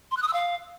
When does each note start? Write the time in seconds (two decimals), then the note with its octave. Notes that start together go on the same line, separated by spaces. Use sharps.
0.11 C6
0.17 F#6
0.22 D#6
0.28 E6
0.33 F5